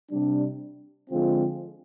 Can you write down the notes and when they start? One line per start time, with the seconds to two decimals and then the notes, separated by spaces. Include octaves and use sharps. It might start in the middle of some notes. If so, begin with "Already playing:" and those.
0.10 C3 G3 D4
1.10 D3 F3 G#3 C4 F4